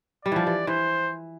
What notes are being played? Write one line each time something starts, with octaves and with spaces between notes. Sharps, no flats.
G3 D5
E3 F3
E3
E3 C5